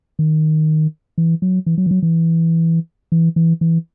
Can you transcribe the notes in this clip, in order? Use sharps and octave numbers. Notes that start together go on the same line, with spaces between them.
D#3
E3
F#3
E3
F#3
E3
F#3
E3
E3
E3
E3